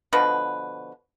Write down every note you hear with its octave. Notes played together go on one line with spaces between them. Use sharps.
B2 D3 F3 B4